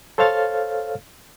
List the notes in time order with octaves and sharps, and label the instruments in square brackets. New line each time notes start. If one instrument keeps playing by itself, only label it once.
[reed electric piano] A4 C5 C#5 F5 F6 A6